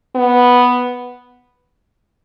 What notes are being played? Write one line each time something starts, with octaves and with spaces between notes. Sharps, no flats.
B3